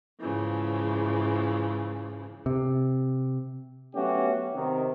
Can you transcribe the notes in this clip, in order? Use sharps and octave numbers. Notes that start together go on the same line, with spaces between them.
G#2 C#3 E3 F3
C3
F#3 A3 B3 C#4 F#4 G4
C3 D#3